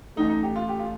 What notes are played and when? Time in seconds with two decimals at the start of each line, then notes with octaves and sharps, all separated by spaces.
0.16 A1 A2 A3 D#4
0.29 D#4
0.43 G4
0.56 F4
0.69 G4
0.79 F4